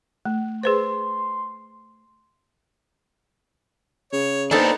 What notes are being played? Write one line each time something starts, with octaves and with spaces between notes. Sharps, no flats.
A3
G#4 B4 C5 C6
C#3 C#5
B3 D4 D#4 A4 C5 A5